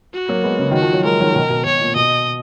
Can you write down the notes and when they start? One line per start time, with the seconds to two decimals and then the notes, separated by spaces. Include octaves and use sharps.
0.13 F#4
0.29 F#3 A#3
0.43 G#3 B3
0.59 C#3
0.71 D#3 F#4
0.82 F3
0.93 F#3
1.04 F3 G#3 A#4
1.20 D#3 F#3
1.35 B2 D#3
1.50 B2
1.65 B2 C#5
1.81 A#2
1.95 B2 D#5